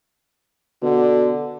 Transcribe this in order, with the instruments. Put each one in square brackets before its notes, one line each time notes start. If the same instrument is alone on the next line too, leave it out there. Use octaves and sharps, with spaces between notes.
[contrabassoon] B2 [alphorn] D3